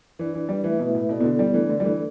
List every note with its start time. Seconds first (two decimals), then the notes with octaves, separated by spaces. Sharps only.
0.19 E3 D4 B4 D5
0.34 E3
0.49 G3
0.64 E3 A3 E4 B4 E5
0.79 B2
0.95 A2
1.09 B2 B3 E4 A4 D5
1.20 B2
1.24 D3
1.39 G3
1.54 E3 A3 D4 A4 D5
1.70 D3
1.80 G3
1.85 E3